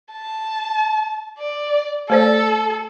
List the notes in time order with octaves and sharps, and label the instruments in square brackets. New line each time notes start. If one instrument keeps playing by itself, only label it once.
[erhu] A5
D5
[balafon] A3 C5 D5 [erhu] A4